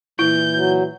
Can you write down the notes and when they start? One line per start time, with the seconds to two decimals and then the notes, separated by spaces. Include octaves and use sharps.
0.19 A#2 E3 E4 G6
0.54 F#3